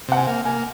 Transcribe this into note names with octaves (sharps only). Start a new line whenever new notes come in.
C3 F#5
G#5
A#3
A#3 G#5